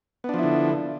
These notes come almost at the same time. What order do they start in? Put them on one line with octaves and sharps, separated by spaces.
B3 D4 F3 E4 D3